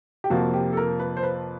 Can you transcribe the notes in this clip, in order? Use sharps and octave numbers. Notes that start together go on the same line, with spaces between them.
G4
F2 C3 F3 A#3 F#4
G4
A4
A#4
B4
C5
B4